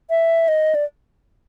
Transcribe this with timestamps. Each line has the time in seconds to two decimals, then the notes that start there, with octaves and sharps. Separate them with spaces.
0.10 E5
0.48 D#5
0.75 D5